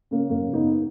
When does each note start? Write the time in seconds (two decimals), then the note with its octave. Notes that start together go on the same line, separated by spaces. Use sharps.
0.11 C#3 A#3 C#4
0.29 F#2 A#3 C#4
0.47 C#3
0.53 B3 D#4